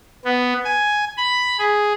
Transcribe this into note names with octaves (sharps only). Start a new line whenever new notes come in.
B3
G#5
B5
G#4